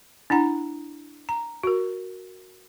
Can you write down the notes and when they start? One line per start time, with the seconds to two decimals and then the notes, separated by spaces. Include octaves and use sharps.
0.30 D4 E4 F#5 A#5
1.29 A#5
1.63 F#4 A#4